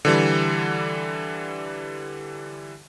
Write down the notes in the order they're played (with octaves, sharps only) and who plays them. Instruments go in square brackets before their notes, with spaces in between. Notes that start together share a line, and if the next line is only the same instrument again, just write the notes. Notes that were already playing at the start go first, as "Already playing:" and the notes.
[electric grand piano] D3 E3 G3